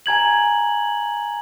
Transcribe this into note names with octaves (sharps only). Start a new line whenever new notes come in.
G#5 A#5 G#6 F#7